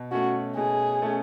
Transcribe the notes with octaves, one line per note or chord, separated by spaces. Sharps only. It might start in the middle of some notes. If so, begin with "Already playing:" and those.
Already playing: B2
A3 C#4 F#4
B2 G#4
A3 C#4